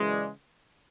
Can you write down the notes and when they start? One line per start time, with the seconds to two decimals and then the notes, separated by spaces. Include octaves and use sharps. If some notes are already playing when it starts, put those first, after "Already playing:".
Already playing: F#2 C#3 E3 G#3
0.09 D5